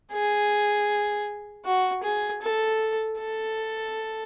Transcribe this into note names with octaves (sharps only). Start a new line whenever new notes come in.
G#4
F#4
G#4
A4
A4